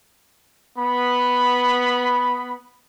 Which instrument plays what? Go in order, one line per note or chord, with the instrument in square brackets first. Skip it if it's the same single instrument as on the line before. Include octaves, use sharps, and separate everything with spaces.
[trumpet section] B3 B5